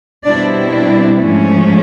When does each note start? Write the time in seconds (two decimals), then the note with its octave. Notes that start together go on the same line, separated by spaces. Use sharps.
0.24 B2 G3 C4 D4 E4 D5
0.73 D4 D5
1.23 G#2 F3 A3 C#4